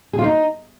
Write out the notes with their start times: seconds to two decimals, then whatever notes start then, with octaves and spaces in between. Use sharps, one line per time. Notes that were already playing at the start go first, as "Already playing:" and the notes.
0.13 G#4
0.19 F4
0.24 D#4